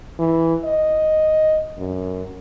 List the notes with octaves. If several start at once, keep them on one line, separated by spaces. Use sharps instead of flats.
E3
D#5
F#2